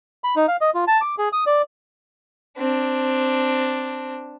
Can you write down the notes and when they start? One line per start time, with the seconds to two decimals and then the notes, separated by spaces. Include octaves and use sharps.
0.24 B5
0.36 D#4
0.48 F5
0.61 D#5
0.75 F4
0.88 A5
1.01 D6
1.18 G#4
1.33 D#6
1.46 D5
2.58 C4 D4